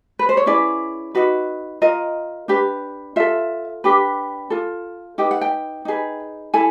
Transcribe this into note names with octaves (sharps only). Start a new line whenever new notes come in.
B4
C5
C#5
C#4 E4 G#4 B4 D5
D#4 F#4 B4
F4 A#4 D#5
D4 G4 B4
F4 A4 E5
D4 G4 B4
F4 A4
D#4 G4 B4 G5
F#5
G5
D#4 G#4 B4
E4 A4 G#5